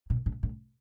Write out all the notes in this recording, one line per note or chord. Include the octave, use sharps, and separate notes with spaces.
A#2
A2
A2